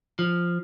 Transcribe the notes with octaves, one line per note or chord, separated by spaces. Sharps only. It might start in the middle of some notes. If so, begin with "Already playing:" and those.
F3